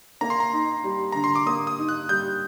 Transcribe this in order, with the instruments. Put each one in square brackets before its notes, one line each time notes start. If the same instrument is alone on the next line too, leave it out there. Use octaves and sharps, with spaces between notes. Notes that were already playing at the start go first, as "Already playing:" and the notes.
[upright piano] A#3 [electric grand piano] A#5
[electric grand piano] C6
A#5
[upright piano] D#4
G3
[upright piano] D3 [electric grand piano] A#5
[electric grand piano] C6
D6
[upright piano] A#3 [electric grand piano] D#6
[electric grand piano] D#6
[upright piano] D#4
[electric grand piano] F#6
[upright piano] G3 [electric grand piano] G6